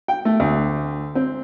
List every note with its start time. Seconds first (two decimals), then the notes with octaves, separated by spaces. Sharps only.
0.08 G5
0.25 A3
0.40 D2
1.15 C4